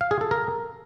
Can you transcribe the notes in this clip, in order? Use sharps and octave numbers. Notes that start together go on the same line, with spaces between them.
F5
G#4
A4
A#4